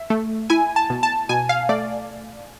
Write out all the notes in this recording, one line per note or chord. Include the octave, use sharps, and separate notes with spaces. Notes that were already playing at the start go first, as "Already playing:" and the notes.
Already playing: E5
A3
E4 G#5
A5
B2
A5
B2 G#5
F5
A3 D5